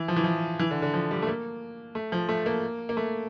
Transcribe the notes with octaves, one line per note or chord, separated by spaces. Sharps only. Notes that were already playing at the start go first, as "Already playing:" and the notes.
Already playing: E3
F3
E3
F3
E3
D3
D3
F3
G3
A3
A#3
A3
F3
A3
A#3
A#3
A3